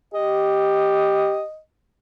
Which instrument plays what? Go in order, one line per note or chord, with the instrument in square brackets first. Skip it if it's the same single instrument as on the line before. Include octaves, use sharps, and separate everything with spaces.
[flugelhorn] G4 [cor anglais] D#5